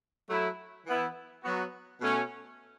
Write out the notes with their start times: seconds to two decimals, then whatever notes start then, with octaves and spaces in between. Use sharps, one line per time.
0.28 F#3 A3 E4
0.86 E3 B3 E4
1.44 F#3 B3 F#4
2.01 B2 A3 C#4